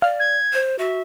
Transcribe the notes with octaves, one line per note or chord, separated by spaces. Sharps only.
D5 F5 F6
G#6
C5
F#4 E5